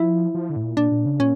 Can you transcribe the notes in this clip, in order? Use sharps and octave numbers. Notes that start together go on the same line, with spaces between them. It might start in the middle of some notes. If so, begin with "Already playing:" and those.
Already playing: F3 E4
F3
D3
A2
A#2
A#2 D4
A#2
C#3
A#2 C#4